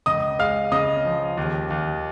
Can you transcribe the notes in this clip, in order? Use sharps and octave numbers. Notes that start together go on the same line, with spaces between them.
C#2 D#5 D#6
G#3 F5 F6
C#3 D#5 D#6
F3
D#2
D#2